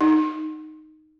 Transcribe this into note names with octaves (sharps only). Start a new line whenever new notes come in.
D#4